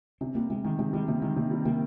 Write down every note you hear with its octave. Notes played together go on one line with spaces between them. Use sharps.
C3 C4
G3 A#3
C3 G#3
D#3 G#3
C3 G#3
G3 G#3
C3 A#3
D#3 G#3
C3 A#3
G3
C3 A#3